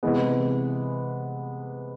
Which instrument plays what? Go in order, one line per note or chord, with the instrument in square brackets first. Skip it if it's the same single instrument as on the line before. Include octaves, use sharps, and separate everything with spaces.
[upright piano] C3 E3 G#3 B3